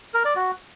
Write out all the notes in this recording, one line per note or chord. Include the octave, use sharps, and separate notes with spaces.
A#4
D5
F#4